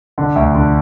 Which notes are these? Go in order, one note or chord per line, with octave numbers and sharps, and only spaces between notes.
D3
D2
D3